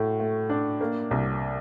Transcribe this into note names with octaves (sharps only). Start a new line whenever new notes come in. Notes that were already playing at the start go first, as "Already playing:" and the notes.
Already playing: A2 A3 F#4
A3
D4
A#3
C2